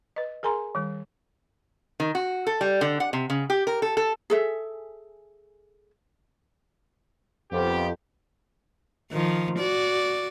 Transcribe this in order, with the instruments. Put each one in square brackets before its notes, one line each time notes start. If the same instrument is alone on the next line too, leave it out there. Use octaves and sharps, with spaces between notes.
[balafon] B4 D#5
G#4 A#4 G#5 A#5 C6
D#3 G3
[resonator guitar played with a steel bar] D#3
F#4
A4
G3
D3
F#5
C3
C#3
G4
A#4
A4
A4
[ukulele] G#4 A4 E5
[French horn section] F2 [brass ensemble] B3 F4 G4
[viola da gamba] D#3 F3
F#4 D5